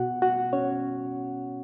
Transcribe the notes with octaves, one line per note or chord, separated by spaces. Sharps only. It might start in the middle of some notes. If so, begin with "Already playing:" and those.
Already playing: B2 B3 F#4 F#5
F#4 F#5
C#4 C#5